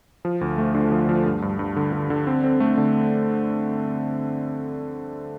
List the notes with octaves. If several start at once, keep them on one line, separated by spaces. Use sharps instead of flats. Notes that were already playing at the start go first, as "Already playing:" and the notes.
F3
D2
A3
D3
F3
F3
G2
G2
G2
D3
D3
D3
C4
C4
A3
D3